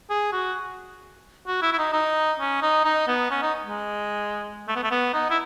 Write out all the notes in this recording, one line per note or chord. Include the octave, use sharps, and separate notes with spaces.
G#4
F#4
F#4
E4
E4
D#4
D#4
C#4
D#4
D#4
B3
C#4
D#4
G#3
A3
B3
A3
B3
D#4
E4